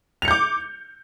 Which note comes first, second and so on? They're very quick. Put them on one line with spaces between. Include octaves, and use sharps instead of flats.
F7 C#7 G6 D6